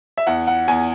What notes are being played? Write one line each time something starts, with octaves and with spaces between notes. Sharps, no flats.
E5
E2 F#5
F#5
E2 G#5